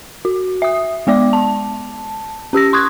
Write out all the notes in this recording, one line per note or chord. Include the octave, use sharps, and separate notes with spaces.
F#4
E5 D#6
G#3 B3 D5 D6
A5
C#4 G4 E6 A#6
C6 C#6 D#6 F#6 G#6